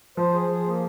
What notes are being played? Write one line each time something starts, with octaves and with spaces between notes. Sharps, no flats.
F3 C5
G#4
G#4
A#3